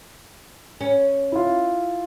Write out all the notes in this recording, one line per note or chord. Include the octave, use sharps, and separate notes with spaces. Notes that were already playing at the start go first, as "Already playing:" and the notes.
C#4
E4 F4